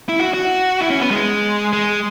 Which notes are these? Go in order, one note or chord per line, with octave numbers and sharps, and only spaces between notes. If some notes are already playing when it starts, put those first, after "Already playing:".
E4
F#4
F#4
E4
C#4
B3
G#3
G#3